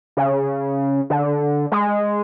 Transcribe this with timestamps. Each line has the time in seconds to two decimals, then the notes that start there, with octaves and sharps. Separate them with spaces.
0.17 C#3
1.10 D3
1.72 G#3